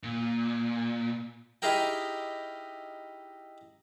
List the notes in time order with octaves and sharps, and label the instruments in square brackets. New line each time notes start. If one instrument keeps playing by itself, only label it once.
[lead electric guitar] A#2
[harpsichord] D#4 E4 G4 G#4 A#4 G5